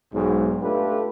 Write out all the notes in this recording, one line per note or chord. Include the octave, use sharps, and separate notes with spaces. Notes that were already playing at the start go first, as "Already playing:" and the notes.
B1 G#2
A3 D4 F4 G4 A4 B4